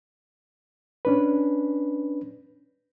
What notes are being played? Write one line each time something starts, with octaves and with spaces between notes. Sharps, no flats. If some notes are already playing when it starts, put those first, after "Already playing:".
C#4 D4 B4